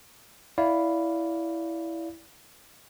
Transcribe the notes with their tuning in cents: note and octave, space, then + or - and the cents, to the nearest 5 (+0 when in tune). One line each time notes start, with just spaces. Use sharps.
E4 +0 D5 -25 F5 +0